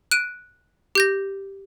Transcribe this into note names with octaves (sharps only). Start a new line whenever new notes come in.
F#6 D7 D#7
G4 G6 A#6